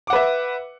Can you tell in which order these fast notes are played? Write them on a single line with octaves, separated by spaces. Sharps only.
D6 F#5 B4 E5